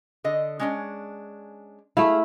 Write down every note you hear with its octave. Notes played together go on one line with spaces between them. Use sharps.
D3 D#5
G#3 C#4 D4
A3 E4 G#4 F5